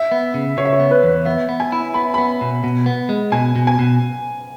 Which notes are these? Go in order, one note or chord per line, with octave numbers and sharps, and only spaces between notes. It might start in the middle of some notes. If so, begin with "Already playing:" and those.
Already playing: E5
B3
C#3
C#3 C#5
E5
C#5
B3
B4
E2
B3 E5
B3
G#5
E4
B3 B5
B3 B5
B2
B2
B3
G#3
B2 G#5
B2
G#5
B2